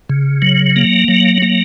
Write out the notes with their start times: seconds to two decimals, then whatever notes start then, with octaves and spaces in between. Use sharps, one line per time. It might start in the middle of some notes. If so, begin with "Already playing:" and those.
0.10 C#3
0.42 F#3
0.76 A#3
1.08 F#3
1.42 A#3